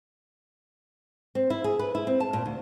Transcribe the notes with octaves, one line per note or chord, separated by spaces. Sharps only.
C4
E4
G#4
B4
E4
C4
A5
A#2
D2